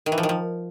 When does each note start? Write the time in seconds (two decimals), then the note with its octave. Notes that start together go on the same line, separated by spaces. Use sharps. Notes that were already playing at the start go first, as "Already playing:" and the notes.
0.06 D#3
0.12 E3
0.18 F3
0.23 D#3
0.29 F3